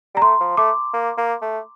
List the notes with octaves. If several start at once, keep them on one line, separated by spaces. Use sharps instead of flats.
G3 A#5
A3 C6
F3
A3 D6
A#3
A#3
A3